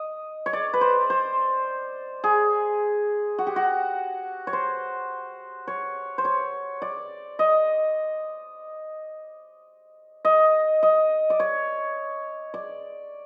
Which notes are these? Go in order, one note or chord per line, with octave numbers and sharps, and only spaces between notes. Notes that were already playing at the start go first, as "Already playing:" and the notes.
Already playing: D#5
C#5
D5
B4
C5
C5
G#4
F#4
G4
F#4
C#5
C5
C#5
C5
C#5
D5
D#5
D#5
D#5
D5
C#5
D5